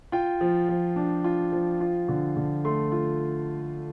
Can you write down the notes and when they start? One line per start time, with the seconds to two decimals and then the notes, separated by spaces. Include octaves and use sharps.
0.12 F4 G5
0.41 F3
0.69 F3
0.96 D4
1.24 F4
1.52 F3
1.81 F4
2.09 D3
2.36 D3
2.64 A3 C6
2.92 F4